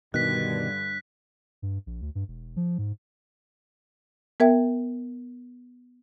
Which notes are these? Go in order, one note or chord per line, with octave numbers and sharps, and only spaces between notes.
G2 B2 D3 D#3 F#6 B6
G2
A#1
D2
G2
E1
F3
G#2
B3 A#4 E5 G5